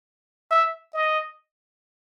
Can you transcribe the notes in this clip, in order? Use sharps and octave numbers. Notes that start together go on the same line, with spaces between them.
E5
D#5